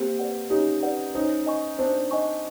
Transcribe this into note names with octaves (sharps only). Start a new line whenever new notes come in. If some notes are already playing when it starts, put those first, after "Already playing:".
Already playing: A#3 C4 G4
B4 D5 F#5
C#4 D#4 G4
B4 D5 F#5
C#4 D#4 C5
D#5 G#5 C#6
C4 D4 C5
D#5 G#5 C#6